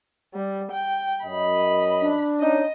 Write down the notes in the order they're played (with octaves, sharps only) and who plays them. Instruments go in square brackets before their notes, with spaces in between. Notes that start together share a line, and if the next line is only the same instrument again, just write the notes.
[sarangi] G3
G5
[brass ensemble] F#2 D#5 [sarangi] B5
[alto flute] D4
[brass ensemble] C#4 D#4 [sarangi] D#5